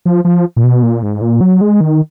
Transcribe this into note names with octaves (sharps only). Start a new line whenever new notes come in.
F3
F3
A#2
B2
A#2
G#2
A#2
F#3
G#3
D#3